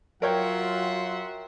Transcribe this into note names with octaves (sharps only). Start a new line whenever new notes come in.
F#3 F4 A#4 C#5 E5 F#5 G5 C6